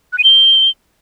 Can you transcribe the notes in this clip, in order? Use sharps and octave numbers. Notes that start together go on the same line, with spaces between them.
F#6
D#7
G7